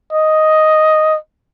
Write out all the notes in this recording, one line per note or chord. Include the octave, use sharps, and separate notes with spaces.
D#5